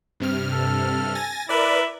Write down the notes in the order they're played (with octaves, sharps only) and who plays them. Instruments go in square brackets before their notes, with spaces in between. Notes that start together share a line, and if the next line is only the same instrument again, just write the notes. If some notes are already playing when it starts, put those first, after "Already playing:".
[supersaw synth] G2 C3 F6
[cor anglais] A4
[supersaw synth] G#5 A6 A#6
[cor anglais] E4 [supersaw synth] A#4 B4 D5